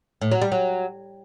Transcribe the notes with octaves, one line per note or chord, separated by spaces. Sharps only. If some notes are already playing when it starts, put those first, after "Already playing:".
A2
F#3
G3
F#3